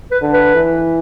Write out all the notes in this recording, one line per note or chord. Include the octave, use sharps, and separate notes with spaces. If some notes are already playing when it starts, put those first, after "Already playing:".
B4
D3
B4
E3